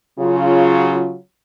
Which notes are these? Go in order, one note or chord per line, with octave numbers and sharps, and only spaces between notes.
C#3 F#3 F4